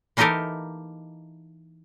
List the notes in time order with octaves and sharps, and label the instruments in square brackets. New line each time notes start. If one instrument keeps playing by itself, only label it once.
[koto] E3 A#3 D#4 G4 A4 A#4